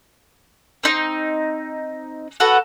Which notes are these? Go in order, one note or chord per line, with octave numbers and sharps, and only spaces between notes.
C4 D#4 D#5
F#4 A4 B4 F#5